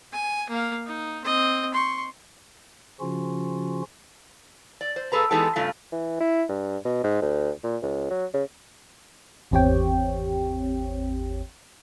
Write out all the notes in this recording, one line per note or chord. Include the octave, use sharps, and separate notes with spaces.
G#5
A#3 F5
D#4
C4 D#5
C6 C#6
C#3 F3 C#4 F4 F#4
D5
C5
A#2 G#4 A4 B4 A#5
E3 G#3 B3 D#4 G4 A4
G2 C#3 A3 F4
E3
E4
G2
B2
G#2
D2
A#2
C#2
F#3
C#3
G#1 E2 C4 G4 C#5 G5